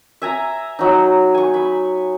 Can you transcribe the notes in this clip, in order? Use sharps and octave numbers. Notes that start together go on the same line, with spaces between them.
E5 G#5 A#5
F#3 D#4
G#5 C#6
B5